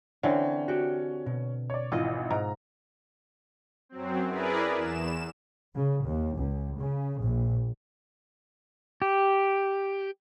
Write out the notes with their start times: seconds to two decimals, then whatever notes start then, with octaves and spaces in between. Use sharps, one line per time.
0.23 D3 E3 C4 C#4
0.68 F#4 G4
1.26 B2
1.70 C#5 D5
1.92 G#1 E3 F4 D#5
2.31 G#2 A#5
3.89 F#2 F#3 C4
4.28 E4 G#4 A#4 B4 D5
4.76 E2 E7
5.75 C#3
6.06 D#2
6.37 C#2
6.79 C#3
7.21 A#1
9.02 G4